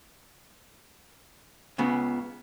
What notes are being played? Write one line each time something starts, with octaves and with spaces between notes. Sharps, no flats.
C#2 C#3 B3